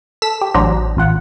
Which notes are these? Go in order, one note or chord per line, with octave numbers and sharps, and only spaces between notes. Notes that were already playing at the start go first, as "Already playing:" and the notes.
A4 B6 E7
G4
A1 F#3 D4 C5 A#5
A1 F4 F#5